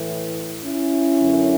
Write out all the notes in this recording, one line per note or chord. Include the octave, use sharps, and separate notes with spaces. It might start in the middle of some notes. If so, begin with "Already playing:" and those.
Already playing: A2 E3
C#4 E4
F#2 D3